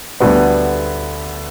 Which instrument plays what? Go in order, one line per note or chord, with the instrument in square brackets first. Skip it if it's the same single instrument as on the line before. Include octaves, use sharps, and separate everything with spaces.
[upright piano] D2 D3 G3 B3